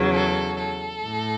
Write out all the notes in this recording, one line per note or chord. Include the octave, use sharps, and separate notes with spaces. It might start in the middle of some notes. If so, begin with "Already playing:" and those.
Already playing: E2 C#3 F#3
A4
A4
A2